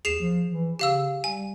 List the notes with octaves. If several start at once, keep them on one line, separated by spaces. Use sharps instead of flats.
D#2 G#4 C7 E7
F3
E3
C#3 G4 F5 E6
G3 G#5